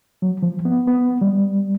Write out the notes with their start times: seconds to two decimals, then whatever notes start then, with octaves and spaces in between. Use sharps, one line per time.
0.22 F#3
0.43 F3
0.65 B3
0.87 B3
1.21 G3